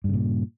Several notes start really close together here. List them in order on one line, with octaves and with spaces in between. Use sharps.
G2 C#3 A#2